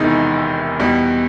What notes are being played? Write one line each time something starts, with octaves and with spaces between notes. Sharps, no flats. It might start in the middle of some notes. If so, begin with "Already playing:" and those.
Already playing: E1 E2 C3 D#3 G#3 D#4 E4
E2 B2 G3